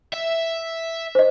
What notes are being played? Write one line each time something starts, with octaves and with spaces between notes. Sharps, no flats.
E5
C5 D#5